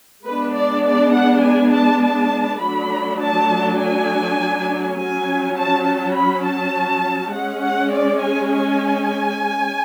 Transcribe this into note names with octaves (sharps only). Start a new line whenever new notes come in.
G#3 B3 D4 B4
D5
D5
F#5
G#5
A5
A5
F#3 A3 D4 B5
A5
G#5
F#3 C#4 G#5
A5
A5
B5
A5
G#3 C#4 F#5
F#5
D5
G#5
G#5